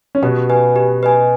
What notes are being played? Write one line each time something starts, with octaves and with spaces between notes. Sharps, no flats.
C#4
B2 B3 G4
B4 D#5 G#5
G4
B4 D#5 G#5